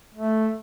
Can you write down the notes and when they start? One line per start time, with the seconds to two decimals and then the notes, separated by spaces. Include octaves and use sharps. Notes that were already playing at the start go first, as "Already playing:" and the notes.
0.14 A3